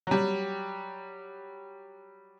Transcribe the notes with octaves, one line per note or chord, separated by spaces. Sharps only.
F#3 G3